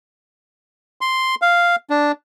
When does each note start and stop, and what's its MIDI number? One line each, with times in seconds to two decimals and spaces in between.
1.01 1.35 84
1.42 1.76 77
1.90 2.12 62